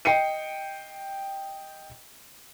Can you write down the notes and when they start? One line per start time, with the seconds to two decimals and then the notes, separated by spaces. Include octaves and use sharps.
0.05 D#5 G5 C7 C#7 D#7